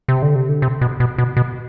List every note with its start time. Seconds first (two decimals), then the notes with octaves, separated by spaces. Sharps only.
0.08 C3
0.22 D3
0.35 C3
0.49 D3
0.62 C3
0.81 B2
1.00 B2
1.18 B2
1.37 B2